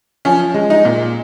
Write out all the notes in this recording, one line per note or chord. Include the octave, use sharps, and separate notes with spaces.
F3 C#4
G#3
D#4
A#2